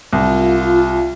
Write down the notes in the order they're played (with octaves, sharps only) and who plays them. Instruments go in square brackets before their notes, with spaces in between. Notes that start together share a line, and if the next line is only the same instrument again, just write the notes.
[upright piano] C2 [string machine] F4